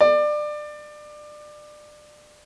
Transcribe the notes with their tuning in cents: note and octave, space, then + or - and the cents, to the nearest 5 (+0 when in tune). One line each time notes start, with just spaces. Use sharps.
D5 +25